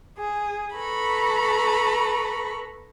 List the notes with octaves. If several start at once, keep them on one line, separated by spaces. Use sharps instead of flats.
G#4
A4 B4 A#5 B5 C#6